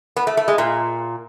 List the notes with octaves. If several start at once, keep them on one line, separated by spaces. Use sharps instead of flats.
B3
A3
A3
G#3
A#2